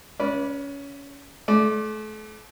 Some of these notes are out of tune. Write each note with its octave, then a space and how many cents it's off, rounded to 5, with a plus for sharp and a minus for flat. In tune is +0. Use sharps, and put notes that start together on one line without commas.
C#4 +20 B4 -20 D5 -15
A3 -35 D5 +0